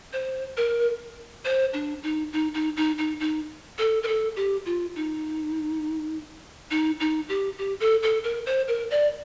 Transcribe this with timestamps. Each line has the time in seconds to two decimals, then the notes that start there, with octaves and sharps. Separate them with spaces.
0.13 C5
0.57 A#4
1.45 C5
1.73 D4
2.03 D#4
2.33 D#4
2.54 D#4
2.76 D#4
2.98 D#4
3.20 D#4
3.78 A4
4.03 A#4
4.08 A4
4.36 G4
4.66 F4
4.96 D#4
6.71 D#4
7.00 D#4
7.29 G4
7.58 G4
7.80 A4
8.03 A4
8.24 A#4
8.46 C5
8.68 A#4
8.91 D5